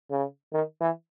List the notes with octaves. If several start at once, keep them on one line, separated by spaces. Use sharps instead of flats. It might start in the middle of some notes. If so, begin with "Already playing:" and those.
C#3
D#3
E3